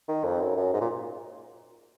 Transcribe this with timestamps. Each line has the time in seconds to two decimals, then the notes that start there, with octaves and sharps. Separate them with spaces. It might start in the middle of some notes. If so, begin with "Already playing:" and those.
0.08 D#3
0.25 F2
0.41 F#2
0.56 F#2
0.73 G#2
0.81 A#2